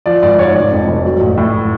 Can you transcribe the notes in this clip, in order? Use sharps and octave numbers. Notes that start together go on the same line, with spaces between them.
F3 D5
G#1 D5
G#2 C#5
F1 D5
F2
F1
F#3
A1
A2